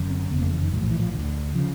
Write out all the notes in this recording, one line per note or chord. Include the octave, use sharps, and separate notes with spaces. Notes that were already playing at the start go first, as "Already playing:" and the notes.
Already playing: F#1 F#2 D3
C4
F#1 F2 C#3 B3
A#3
E3
D#3
A#1 A2 F#3
F3
E3
F3
D2 D3
C#3 F3